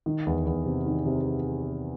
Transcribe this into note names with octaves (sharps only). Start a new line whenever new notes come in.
D#3
E2
E2
C3
D#3
C3